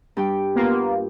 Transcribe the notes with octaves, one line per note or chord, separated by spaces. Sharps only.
G2 G4 G5
A#3 B3 F4